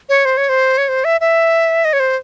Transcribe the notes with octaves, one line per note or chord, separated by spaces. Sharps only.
C#5
C5
C#5
C5
C#5
C5
E5
E5
D#5
C#5
C5